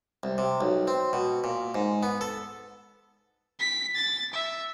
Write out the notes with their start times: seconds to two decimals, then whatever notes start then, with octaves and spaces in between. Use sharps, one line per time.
0.23 C2
0.38 C3
0.61 B1
0.88 C4
1.13 B2
1.44 A#2
1.75 G#2
2.03 B3
2.21 A4
3.60 B6
3.96 A6
4.34 E5